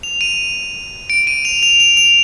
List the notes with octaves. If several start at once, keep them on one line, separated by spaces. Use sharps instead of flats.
F7
D#7
D7
D#7
F7
F7
F7
F7